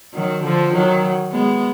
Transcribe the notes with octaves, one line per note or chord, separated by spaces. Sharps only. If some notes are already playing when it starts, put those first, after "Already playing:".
D#3 F#3
D3 F3
D#3 F#3
G#3 B3